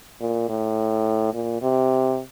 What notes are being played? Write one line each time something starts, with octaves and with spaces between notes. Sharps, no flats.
A#2
A2
A#2
C3